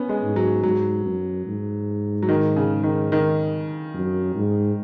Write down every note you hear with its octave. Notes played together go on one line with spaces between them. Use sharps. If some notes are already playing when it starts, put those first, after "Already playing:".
Already playing: B3 C#4
G#3
G#2
F#3
G#2 F#3
F#2
G#2
F#3
D#3
C#3
D#3
D#3
F#2
G#2